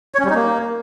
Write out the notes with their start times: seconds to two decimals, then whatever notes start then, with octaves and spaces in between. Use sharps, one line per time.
0.15 C#5
0.20 C#4
0.25 G3
0.30 D#4
0.35 A#3